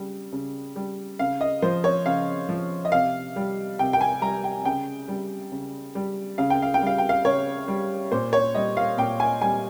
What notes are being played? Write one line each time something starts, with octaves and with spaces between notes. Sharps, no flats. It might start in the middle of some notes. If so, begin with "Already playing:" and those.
Already playing: C#3 G3
C#3
G3
C#3 F5
D#5
F3 C5
C#5
C#3 F5
F3
D#5
C3 F5
G3
C3 G5
G5
G#5
G3 A#5
G5
C#3 G5
G3
C#3
G3
C#3 F5
G5
F5
G5
G3 F5
G5
F5
C#3 C#5
G3
A#2 C5
C#5
G3 D#5
F5
A#2 G5
G#5
G3 G#5